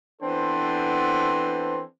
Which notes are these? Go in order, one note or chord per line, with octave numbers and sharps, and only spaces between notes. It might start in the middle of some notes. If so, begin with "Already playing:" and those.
E3 B3 C4 D4 A4 C5